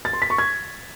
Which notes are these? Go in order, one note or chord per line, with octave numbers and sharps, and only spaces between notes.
A6
C6
B6
C#6
G#6